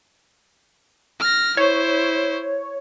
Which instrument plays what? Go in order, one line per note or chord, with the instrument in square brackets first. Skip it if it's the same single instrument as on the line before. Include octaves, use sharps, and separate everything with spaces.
[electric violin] F6 A#6
[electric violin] E4 C5 [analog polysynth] C#5